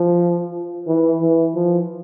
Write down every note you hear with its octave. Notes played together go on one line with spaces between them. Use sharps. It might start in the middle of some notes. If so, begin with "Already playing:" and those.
Already playing: F3
E3
E3
F3